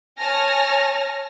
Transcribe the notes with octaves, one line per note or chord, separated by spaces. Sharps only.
C#5 G#5 A5 F6 A#6